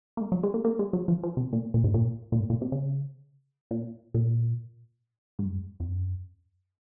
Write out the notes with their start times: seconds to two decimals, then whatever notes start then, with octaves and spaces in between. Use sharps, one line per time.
0.17 A#3
0.21 G#3
0.32 F#3
0.43 G#3
0.54 A#3
0.65 A#3
0.79 G#3
0.93 F#3
1.08 F3
1.23 F3
1.37 C3
1.53 A#2
1.74 A#2
1.84 G#2
1.94 A#2
2.32 A#2
2.40 G#2
2.50 A#2
2.62 C3
2.72 C#3
3.71 A#2
4.14 A#2
5.39 G#2
5.45 F#2
5.80 F2
5.89 F#2